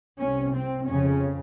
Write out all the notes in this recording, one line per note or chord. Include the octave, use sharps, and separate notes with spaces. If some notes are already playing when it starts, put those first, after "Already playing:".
C2 C3 C#4
C4
F2 C#3 C#4